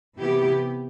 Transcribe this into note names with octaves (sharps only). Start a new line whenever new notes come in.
C3 E3 B3 E4 G4